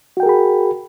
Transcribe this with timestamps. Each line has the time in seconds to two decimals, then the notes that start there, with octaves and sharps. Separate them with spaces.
0.17 F#4
0.20 G5
0.23 A#4
0.26 G#4
0.29 B5